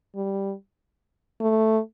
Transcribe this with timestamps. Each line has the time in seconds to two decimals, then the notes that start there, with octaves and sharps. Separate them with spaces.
0.15 G3
1.41 A3